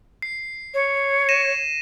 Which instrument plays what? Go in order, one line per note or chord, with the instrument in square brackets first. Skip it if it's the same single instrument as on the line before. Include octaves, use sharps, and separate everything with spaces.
[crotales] C7
[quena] C#5
[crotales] A#6 D#7 E7